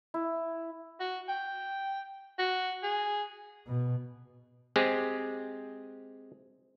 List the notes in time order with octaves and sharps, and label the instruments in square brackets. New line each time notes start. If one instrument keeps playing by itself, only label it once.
[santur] E4
[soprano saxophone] F#4
G5
F#4
G#4
[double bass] B2
[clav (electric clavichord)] G#3 C4 G4 G#4